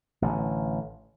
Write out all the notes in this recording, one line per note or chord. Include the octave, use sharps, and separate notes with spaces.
A1 D3